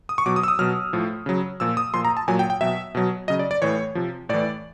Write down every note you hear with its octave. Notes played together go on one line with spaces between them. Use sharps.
D#6
C#6
B2 F#3 D6
D#6
E6
D#6
B2 F#3 F6
A2 F3
C#3 F#3
A#2 F3 E6
D#6
A#2 F3 C6
A#5
A5
A#2 F#3 G#5
G5
G5
B2 F#3 E5
B2 F#3
C#3 F#3 D#5
D5
D5
A2 E3 C#5
C3 F3
A2 E3 D5